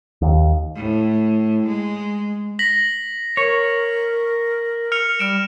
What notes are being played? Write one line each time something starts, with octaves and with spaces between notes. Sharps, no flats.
D#2
A2
G#3
A#6 B6 F#7
A#4 C#5
F6 C#7 F7
G3 F6 D7 E7